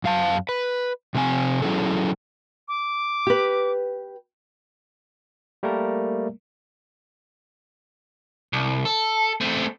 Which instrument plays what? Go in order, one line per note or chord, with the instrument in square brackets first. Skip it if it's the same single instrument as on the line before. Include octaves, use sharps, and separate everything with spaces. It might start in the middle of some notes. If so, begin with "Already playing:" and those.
[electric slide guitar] F#2 F5 A5
B4
C3 F3 C4 G#5
F#3 C#4 E4 G#4 A4
[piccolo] D6
[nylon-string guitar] G4 B4
[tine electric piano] G3 A3 A#3 A#4
[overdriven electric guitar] C2
A4
A3 C4